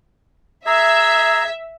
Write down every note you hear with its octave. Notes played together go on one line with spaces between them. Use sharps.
G#4 E5 A#5 E6